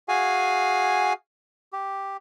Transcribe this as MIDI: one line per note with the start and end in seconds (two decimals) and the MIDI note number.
0.08 1.13 66
0.08 1.13 68
0.08 1.13 77
0.08 1.13 80
1.73 2.17 67